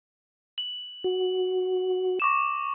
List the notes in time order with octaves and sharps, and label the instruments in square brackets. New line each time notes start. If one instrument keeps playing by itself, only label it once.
[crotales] F#7
[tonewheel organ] F#4
[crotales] C#6 D6 E7